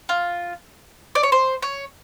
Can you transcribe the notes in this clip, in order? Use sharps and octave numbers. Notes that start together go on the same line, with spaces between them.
F4
D5
C#5
C5
C#5